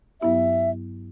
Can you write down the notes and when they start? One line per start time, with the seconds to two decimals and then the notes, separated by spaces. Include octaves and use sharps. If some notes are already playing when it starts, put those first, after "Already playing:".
0.21 G2 F#3 B3 E4 G4 E5